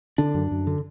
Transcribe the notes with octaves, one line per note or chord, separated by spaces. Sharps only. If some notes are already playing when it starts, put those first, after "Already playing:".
D3 D4
F#2
F#2
D3